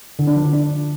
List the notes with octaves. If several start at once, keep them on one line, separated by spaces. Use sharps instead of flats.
D3
D4
F3
D3
D4